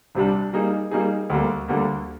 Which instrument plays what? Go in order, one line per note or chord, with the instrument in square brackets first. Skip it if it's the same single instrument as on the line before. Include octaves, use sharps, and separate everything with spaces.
[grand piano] C2 C3 G3 D4
G3 A#3 D#4 G#4
G3 A#3 D#4 G#4
D2 D3 G3 A#3
D2 D3 G3 A#3